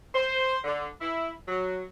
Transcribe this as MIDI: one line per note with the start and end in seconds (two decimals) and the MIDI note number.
0.15 0.58 72
0.64 0.86 50
1.01 1.31 64
1.48 1.82 54